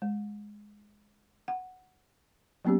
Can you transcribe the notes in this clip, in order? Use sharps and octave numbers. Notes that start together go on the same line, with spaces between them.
G#3
F#5
F#3 A#3 B3 C#4 G4